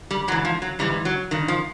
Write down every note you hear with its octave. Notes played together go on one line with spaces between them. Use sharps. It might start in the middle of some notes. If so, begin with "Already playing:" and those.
G3
G#2 E3 F#3
F3
F#3
G#2 E3 G3
F#3
G2 D#3
F3